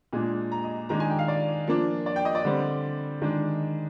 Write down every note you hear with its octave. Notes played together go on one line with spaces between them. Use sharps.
A#2 G#3 D4 G#5
A#5
D#5
D#3 G#3 D4 A#5
G#5
G5
F5
D5
F3 A#3 D4
D5
G5
D#5
D5
D3 G3 C4
D#3 G#3 D4